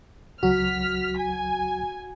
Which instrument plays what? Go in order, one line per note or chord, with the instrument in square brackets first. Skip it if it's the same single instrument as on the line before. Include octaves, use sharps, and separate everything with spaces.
[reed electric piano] C#2 F#3 [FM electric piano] F#4 [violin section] F6 B6
[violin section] G#5